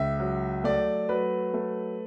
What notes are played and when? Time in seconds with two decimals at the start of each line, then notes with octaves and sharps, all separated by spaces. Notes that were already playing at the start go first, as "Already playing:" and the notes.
Already playing: C#2 E5
0.19 F#3
0.64 A3 D5
1.09 F#3 B4
1.54 A3